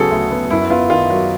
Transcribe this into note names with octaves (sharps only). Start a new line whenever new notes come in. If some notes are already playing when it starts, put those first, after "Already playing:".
Already playing: D2 C#3 F#3 B3 G#4 A4
D2
B3
F#2 E4
B3 F4
D#3 F4
F#3